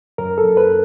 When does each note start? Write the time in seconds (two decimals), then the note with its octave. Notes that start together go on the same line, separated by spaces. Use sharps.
0.18 F#2 A#4
0.38 A4
0.44 F#2
0.57 B4